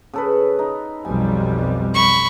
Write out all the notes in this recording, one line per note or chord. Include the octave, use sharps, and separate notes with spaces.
C#3 A4 B4
D#4
B1 F2 G3 G#5
B5 C#6